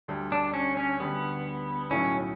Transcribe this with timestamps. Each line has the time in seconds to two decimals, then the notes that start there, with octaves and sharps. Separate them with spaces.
0.08 D2 D3 G3
0.32 D4
0.54 C#4
0.77 C#4
0.99 D2 D3 G3 B3
1.91 B1 A2 F#3 A3 C#4 E4